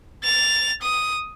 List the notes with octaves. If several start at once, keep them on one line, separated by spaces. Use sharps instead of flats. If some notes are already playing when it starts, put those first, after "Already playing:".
A6 F7
D#6